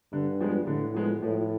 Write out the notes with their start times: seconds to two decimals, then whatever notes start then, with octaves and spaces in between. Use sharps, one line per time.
0.13 G2 D3
0.40 F3 G#3 B3
0.67 A2 D3
0.94 F3 G#3 B3
1.22 A2 F3